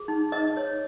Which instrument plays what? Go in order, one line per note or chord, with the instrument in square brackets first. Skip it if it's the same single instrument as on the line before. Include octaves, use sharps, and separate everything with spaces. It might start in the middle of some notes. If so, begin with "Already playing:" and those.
Already playing: [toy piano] G#4
D#4
D#4 D#5
C#5